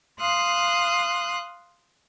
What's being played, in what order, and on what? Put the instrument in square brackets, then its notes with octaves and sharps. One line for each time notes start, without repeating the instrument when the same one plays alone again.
[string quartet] F5 C6 D#6 F#6